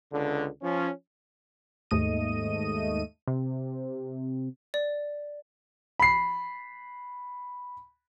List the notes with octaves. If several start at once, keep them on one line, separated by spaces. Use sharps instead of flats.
C#2 D3
F3 C#4
D#2 G#2 A3 D#5 D#7
C3
D5
B5 C7